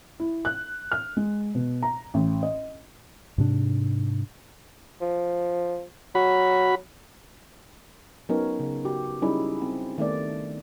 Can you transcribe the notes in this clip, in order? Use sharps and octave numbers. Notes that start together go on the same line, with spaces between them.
E4
F#6
F6
G#3
B2
A#5
A1
D#5
G#2 C3 D4
F3
F#3 F#4 B5
F#3 B3 C#4 D#4 A#4 C#5
C#3
F#3 F#4 G4
F#3 G3 C#4 D#4 E4 G#4
C4
D#3 A3 B3 D5